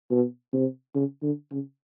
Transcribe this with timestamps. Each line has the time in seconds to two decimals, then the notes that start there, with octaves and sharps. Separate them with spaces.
0.11 B2
0.53 C3
0.95 C#3
1.23 D3
1.52 C#3